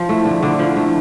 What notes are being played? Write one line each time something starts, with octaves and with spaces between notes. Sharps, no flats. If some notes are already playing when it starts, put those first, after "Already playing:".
Already playing: F3
A3 E4
D3
D3
F3
A3 E4